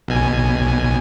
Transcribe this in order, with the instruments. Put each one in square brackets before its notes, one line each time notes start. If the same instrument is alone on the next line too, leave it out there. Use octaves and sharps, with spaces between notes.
[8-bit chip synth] B1 B2 G#5